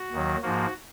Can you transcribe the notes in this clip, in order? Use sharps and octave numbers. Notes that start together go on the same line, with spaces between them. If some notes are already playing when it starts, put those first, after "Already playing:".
Already playing: F#4
D#2 D#3 F#3
G#2 F3 A#3 F#4